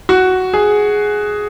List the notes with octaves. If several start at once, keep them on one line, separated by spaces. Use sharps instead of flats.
F#4
G#4